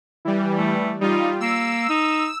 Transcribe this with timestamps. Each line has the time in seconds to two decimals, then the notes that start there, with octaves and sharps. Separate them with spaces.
0.25 E3 G3
0.58 A3
1.01 G3 D#4 F4
1.41 A#3 E6
1.89 D#4